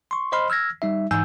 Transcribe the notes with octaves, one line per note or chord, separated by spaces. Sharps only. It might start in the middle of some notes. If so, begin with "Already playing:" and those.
C6 C#6
C5 D#5 B5 C6 F6
E6 F6 G#6 A#6
G3 D#4 E5
G#2 E3 D#4 G#5 E6 G6